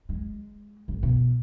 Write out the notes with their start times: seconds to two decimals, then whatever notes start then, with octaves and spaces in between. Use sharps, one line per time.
0.09 G#3
0.88 G#1
1.03 B2